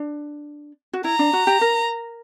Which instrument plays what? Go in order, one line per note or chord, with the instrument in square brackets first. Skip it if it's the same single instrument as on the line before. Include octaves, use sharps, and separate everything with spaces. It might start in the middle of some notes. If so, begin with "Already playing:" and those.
Already playing: [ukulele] D4
F#4
[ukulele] E4 [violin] A#5
[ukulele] D4
F#4
G4
A#4